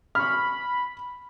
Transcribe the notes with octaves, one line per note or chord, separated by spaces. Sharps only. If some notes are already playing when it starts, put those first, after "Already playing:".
B5 C#6 F6